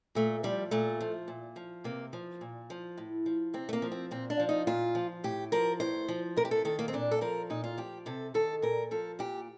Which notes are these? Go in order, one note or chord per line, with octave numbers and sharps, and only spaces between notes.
A#2 A3
F3 G3
A#2 A3
F3
A#2
F3
C3 A#3
F3
A#2
F3
A2
F3
C3 C4
A3
A#3
F3
C4
A#2 C4
D4
F3
D#4
A#2 F4
F3
A2 G4
F3 A#4
A2 C5
F3
C3 A#4
G4
A4
D#3 A4
A#3
C4
A#2 D4
A4
F3 A#4
A#2 D#4
F4
F3 G4
C3 A4
D#3 A4
A#2 A#4
F3 A4
A#2 G4